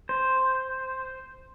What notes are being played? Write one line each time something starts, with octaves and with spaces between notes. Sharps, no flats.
C5